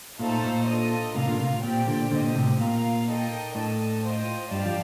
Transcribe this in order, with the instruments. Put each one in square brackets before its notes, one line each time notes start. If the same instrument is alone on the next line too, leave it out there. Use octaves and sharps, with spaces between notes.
[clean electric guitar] A#2 [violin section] A3 D#4 A4 C5 F5
[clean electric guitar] A#2
[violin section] D4 F4 A4 D#5
[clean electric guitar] A2 C3 [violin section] F4 A#4 F5
[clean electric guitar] A#2 D3
A2 C3
[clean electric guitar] A#2 [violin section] C4 G4 D5 G5
[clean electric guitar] A#2 D3
[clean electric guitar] A#2 D3 [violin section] C4 G4 C5 D#5
[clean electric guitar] A#2
A2 C3
[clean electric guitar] A#2 [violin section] F4 A#4 F5
[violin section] A#3 D#4 A4 D#5 G5
[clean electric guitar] A2 [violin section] D4 A4 D#5 A5
[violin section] F4 C5 D#5 G5
[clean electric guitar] G2 [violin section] G4 D5 F5 A5
[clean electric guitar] F3